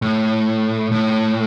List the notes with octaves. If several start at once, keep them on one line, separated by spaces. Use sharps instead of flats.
A2
A2